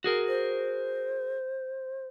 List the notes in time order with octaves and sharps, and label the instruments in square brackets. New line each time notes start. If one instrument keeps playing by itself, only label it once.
[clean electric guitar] F#4 G#4 A#4
[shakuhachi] C5